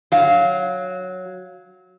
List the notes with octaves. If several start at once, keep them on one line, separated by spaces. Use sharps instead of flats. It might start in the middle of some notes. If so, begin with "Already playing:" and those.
F#3 F5